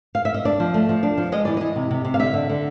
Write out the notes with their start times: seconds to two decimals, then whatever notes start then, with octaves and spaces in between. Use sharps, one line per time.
0.15 F5
0.25 E5
0.34 D#5
0.45 D4 D5
0.60 F3
0.74 A3
0.89 F3
1.03 D4
1.18 F3
1.32 G#3 D#5
1.45 E3 D5
1.57 E3 D#5
1.76 C3
1.91 C3
2.05 C3
2.14 F5
2.19 D3 E5
2.34 D3
2.49 D3